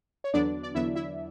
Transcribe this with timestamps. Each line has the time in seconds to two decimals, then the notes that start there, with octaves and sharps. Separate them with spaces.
0.24 C#5
0.34 E2 D3 F#3 B3 D4 D5
0.63 D5
0.74 E2 D3 F#3 B3 E4 E5
0.95 E4 E5